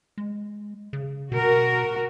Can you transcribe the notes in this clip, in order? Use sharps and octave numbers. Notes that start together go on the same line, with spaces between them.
G#3
C#3
B2 F#4 A#4